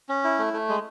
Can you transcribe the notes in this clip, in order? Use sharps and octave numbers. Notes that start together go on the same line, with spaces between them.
C#4
E4
A3
A3
G#3